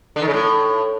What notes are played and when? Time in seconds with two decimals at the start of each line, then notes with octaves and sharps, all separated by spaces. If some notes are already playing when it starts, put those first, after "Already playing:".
0.16 D3
0.22 D#3
0.28 C#3
0.33 A2